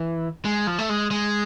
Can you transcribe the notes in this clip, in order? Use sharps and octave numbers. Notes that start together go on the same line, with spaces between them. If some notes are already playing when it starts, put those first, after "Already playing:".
Already playing: E3
G#3
F3
A3
G#3
G#3